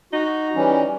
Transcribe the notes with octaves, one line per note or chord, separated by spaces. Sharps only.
D#4 F#4
E3 G3 C#4